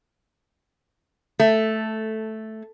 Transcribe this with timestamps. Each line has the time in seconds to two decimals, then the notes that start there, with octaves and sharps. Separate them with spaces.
1.40 A3